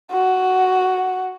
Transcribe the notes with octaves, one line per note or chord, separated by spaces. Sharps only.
F#4